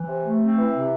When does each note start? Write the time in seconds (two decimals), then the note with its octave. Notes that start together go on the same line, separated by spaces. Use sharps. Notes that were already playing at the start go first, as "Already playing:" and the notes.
Already playing: E3
0.08 C3
0.24 A3
0.41 C4
0.56 E3
0.73 C3